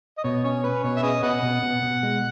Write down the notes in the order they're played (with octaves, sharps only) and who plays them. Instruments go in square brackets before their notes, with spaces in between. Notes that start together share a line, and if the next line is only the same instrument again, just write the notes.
[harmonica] D#5
[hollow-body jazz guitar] B2 [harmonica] C#5
[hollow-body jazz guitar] C#4 [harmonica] C#5
[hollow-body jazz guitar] C#4 [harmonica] B4
[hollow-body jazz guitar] B2 [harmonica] C#5
[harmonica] E5
[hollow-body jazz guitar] C#4 [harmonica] G#4 B4 D#5
[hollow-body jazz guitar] B2 [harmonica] B4 D#5 F#5
[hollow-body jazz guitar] B2
B2
B2
G#3